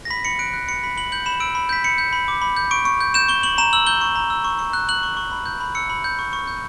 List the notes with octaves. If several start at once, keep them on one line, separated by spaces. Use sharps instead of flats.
A#6
B5 B6
B5 C#7
F#6 D7
F#6
B5 C#7
B5 B6
B5 F#7
G6 F#7
B5 E7
E6 D7
B5
G6 B6
B5 C#7
G6
B5
D6
B5
G6
C#6 D7
C#6
G6
G6 E7
C#6 G7
C#6 F#7
A#5 E7
E6 F#7
G6 G7
C#6
A#5
E6
C#6
C#6
F#6
F#6 F#7
C#6
C#6
B5
G6
B5
E6 C#7
B5
G6
C#6
C#6
G6